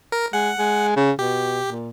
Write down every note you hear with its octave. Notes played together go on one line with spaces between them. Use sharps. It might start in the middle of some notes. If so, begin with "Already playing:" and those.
A#4
G#3 F#5
G#3
C#3
B2 G4
A#2